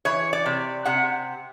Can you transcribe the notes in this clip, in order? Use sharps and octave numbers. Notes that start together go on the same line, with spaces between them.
E3 C#5
D5
C3
C3 F#5